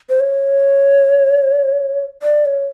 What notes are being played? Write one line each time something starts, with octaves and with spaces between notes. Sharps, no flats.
C5
C#5
D5
C#5